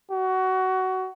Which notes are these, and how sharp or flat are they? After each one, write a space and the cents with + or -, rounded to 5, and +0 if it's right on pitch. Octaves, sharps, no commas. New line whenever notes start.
F#4 +20